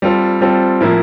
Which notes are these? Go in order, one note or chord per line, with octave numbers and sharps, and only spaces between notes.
G3 C4 F4 A4 C5
G3 C4 F4 A4 C5
A2 F3 A#3 E4